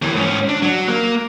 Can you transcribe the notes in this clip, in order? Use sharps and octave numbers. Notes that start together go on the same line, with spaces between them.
D#2 E3
G#2 C#4
D4
F#3
A#3